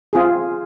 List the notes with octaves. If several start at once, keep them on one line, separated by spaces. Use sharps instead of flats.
C4 F4 G#4